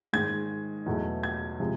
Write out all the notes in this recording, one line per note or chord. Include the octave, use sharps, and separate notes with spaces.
G#2 D#3 G#3 G#6
E2 B2 F#3 A3
G#6
C3 F3 G#3